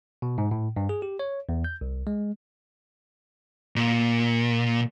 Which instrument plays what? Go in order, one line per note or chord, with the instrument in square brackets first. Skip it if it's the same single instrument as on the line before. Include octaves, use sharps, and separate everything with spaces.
[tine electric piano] B2
G#2
A2
G2
G#4
G4
C#5
E2
G6
C2
G#3
[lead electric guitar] A#2